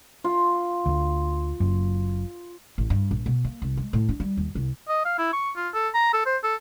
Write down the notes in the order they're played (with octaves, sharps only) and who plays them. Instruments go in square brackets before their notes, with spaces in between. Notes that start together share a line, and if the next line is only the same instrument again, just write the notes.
[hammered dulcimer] F4
[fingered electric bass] D2 D3
F#1 F#2
[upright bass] A1
G2
A#1
B2
A#3
C2
G#3
A2
D4
G3
D#2
C2
[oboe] D#5
F5
E4
C#6
F4
A4
A#5
A4
C5
A4